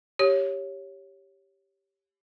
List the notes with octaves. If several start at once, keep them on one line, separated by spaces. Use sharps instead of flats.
G4 C#5